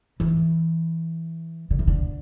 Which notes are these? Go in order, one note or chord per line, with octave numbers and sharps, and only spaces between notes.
E3
D3
E3
D3